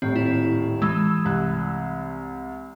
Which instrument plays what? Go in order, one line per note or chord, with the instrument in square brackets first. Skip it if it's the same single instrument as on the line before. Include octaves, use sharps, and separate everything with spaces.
[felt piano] D#1 A2 [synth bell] C4
[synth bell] E4
[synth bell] E3 G#3 [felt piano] E6
[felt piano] C2 F#6